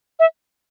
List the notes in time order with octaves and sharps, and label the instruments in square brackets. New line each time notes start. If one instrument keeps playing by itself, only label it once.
[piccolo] E5